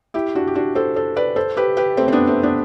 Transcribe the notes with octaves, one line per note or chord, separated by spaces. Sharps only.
E4 G4
D4 F#4
G4
D4 F#4
A4 C5
A4 C5
B4 D5
A4 C5
G4 B4
G4 B4
A3 C4
C4
B3 D4
A3 C4
B3 D4